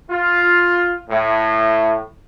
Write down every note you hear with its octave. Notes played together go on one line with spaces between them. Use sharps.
F4
A2